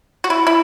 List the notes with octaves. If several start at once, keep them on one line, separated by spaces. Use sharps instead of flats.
F#4
E4
E4